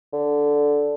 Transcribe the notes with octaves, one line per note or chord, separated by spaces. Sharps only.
D3